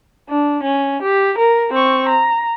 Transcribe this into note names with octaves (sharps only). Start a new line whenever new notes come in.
D4
C#4
G4
A#4
C4 C#6
A#5